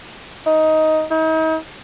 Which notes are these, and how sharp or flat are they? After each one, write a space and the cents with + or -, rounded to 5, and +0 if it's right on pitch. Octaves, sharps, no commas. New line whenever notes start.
D#4 +10
D#4 +40